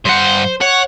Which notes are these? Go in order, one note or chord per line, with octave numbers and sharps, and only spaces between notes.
G2 C5 F#5
C#5 F#5